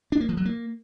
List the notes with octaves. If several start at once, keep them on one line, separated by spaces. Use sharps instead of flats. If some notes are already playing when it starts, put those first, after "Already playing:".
D4
A#3
F3
F#3
A#3